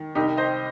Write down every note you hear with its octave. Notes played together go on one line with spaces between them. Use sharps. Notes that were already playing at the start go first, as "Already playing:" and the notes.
Already playing: D#3
C2 D#4 G4
C5 D#5